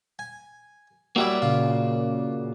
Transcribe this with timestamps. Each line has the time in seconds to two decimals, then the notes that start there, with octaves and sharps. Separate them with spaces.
0.19 G#5
1.16 F#3 G3 A#3 E4 F#4 D5 E5
1.42 A#2 C#3 F4